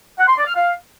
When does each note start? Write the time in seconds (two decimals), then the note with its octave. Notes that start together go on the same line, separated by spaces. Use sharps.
0.19 F#5
0.28 C6
0.37 D5
0.47 F6
0.56 F5